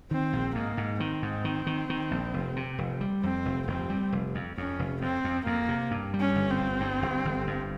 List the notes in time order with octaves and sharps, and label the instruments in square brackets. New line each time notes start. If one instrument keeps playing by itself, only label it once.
[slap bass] D#3 [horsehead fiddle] C4
[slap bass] A#1
[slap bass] G#2 [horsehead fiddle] A#3
[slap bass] G#2
[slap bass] D#3 [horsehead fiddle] C4
[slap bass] G#2
D#3
D#3
D#3
A#1
F1
C3
F1
G3
[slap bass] F2 [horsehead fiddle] C4
[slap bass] F1
[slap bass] F1 [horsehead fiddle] C4
[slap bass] G3
F1
F2
[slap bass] F2 [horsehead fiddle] C#4
[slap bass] F1
[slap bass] F2 [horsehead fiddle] C4
[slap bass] F2
[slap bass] F2 [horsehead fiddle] A#3
[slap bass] C3
G2
G3
[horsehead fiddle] C#4
[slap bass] G1
[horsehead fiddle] C4
[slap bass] G1
G2
G1
G1
G2